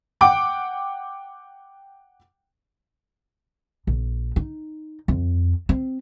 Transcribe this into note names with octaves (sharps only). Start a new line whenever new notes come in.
F#5 G5 D6 D7
A#1
D#4
F2
C4